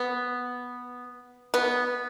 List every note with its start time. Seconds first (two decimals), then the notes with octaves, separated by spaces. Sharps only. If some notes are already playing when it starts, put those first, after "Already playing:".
Already playing: B3
1.54 B3